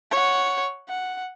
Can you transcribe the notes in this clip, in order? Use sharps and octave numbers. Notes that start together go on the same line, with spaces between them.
C#5 F#5
F#5